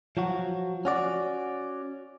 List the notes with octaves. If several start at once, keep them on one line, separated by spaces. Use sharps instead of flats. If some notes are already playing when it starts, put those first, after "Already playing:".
F3 F#3 F#4
C#4 F#4 D5